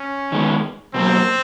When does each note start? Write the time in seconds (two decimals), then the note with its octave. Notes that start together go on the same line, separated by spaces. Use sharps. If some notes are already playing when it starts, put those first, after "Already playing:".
Already playing: C#4
0.32 D#3 G#3 B3
0.94 B2 F#3 A#3 C4